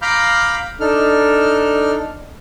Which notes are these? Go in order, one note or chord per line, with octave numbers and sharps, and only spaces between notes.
F5 A#5 B5 D6 F6 G6
D4 D#4 A4 F6